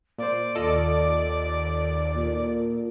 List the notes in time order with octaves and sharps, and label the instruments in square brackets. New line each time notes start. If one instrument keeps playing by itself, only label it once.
[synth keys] A#2 C5 [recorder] D5
[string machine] D#2 [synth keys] F4 A4 D#5
[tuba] A#2